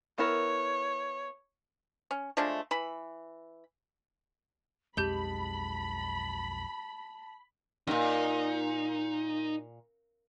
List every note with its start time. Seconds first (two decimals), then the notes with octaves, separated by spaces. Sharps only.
0.18 B3 E4 A#4 C#5
2.11 C#4
2.37 F3 G#3 A3 D4
2.71 E3 B5
4.97 B1 F2 G#3 G4 A5 B5 G6 G7
7.87 F#2 A#2 D#4